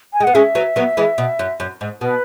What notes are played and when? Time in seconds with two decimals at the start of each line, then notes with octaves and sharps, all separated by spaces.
0.13 G#5
0.20 G#3
0.24 B3 F#5
0.34 G#3 C#4 E5
0.55 F#3 B3
0.76 F#3 B3
0.97 E3 G#3
1.18 B2
1.39 F#2
1.60 F#2
1.81 G#2
2.01 B2 B4